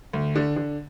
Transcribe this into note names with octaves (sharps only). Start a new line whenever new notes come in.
D2
D3
D3